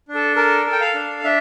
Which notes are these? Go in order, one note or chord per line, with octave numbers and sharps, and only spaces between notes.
D4
A4
A4 A#4
A4
G5
F5
D4
D4 E5